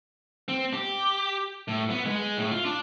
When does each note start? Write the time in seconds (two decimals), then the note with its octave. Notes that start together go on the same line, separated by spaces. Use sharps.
0.48 C4
0.74 G4
1.68 A2
1.90 B3
2.06 G#3
2.38 A2
2.52 F4
2.65 D4